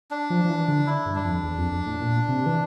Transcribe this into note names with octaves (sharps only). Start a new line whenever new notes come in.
D4
F3
F3
E3
D3
E4
G2
D4
F2
E2
F2
F2
A2
A#2
C3
E3